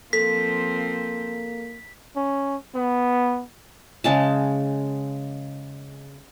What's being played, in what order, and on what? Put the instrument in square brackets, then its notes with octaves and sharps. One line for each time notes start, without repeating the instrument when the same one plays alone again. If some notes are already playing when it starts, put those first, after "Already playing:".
[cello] F3 C4 [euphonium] A#3 [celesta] A4 [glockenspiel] B6
[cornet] C#4
B3
[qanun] C#3 G#3 A5